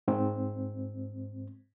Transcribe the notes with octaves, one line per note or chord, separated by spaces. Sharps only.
G#2 C4